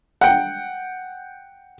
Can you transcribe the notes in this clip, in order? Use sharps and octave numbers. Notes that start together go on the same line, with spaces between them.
F#5 G5